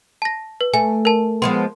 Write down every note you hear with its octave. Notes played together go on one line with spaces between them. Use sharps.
A5 A#6
B4
A3 G#5
A#4 A5
F3 G#3 B3 C6